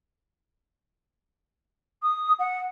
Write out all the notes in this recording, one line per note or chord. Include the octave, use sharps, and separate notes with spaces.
D#6
F#5